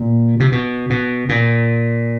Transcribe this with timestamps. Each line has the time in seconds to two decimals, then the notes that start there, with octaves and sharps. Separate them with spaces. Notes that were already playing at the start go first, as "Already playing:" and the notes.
Already playing: A#2
0.40 C3
0.52 B2
0.90 B2
1.29 A#2